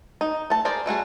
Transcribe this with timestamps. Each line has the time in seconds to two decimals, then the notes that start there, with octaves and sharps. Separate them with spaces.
0.21 D#4
0.50 A3 A5
0.65 G#4 A#4 C5 D5
0.86 G3 A3 F#4 G#4